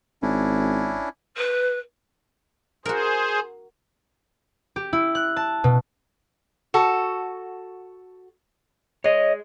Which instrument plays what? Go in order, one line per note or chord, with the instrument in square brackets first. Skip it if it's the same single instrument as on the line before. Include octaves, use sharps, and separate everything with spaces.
[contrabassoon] G#1 [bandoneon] C#4 D4 E4
[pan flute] B4
[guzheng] F#4 A#4 [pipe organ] G#4 C5
[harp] G4
E4
F#6
A5
B2
[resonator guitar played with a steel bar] F#4 A4
[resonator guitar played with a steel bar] G#3 [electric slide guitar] C#5 D#5